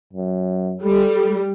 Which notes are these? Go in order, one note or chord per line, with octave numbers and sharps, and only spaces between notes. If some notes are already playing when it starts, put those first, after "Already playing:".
F#2
G3 A4